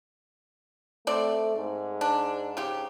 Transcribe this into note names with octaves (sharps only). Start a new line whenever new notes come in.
A3 C4 D5
G#2
D4
C#3 G4